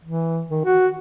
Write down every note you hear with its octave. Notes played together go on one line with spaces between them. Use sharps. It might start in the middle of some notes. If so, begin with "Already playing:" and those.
E3
D#3
F#4